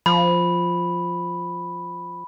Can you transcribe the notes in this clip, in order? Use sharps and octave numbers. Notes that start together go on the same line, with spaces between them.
F3 B5